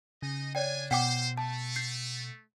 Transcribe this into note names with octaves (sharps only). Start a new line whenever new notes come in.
C#3 D#4 D#5
D4 C#5 D5 G5 G#5
B2 C5 F#5 G5 D6
A3 A5
G6 C7